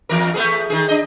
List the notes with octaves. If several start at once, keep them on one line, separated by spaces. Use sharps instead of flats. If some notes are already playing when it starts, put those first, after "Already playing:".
E2 E3 A#4
A3 B3 G#4
D#3 G#4
D4 D#5